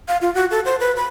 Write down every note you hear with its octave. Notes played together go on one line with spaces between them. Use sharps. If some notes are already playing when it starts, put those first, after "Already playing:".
F5
F4
F#4
A4
C5
B4
B5